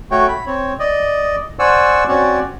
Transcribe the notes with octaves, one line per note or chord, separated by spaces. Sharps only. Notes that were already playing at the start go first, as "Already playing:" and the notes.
A3 F#4 C#5 G5
B5
C4 C#5
D5 D#5
C5 D5 F#5 G#5 C#6 E6
C4 C#4 F#4 C#5 D5